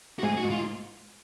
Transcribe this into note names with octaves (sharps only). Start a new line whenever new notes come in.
F#4
G#2 G#4
F#4
G#2
F4